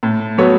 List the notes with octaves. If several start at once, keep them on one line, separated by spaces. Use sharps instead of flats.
A2
F#3 B3 A4 C#5